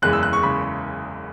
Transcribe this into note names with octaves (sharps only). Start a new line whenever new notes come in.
F#1 E2 C#3 G#3 F#6
E6
F#6
C#6
C#3 G#3 B5